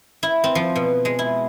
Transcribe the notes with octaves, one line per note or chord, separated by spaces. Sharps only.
E4
C4
F3
B2
G#3
E4